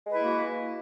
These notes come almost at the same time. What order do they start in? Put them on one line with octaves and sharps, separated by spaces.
G#3 B4 E4 A#3 F#4